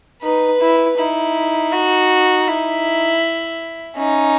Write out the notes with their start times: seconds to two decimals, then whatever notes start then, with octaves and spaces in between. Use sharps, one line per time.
0.23 D#4 B4
0.61 E4
0.98 D#4 E4
1.72 F#4
2.47 E4
3.97 C#4 D#4